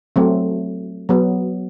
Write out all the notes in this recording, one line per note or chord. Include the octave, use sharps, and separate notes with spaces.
F#3 A3 C4
F#3 B3